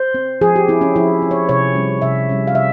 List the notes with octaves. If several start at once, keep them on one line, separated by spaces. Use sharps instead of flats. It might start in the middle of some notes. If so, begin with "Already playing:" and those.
Already playing: C5
C4
F3 G#4
G4
C4 E4
C#4
F3 E4
C4
C#5
C3 C#5
G3 C#4
C3 E5
G3 C#4
F5
C3 E5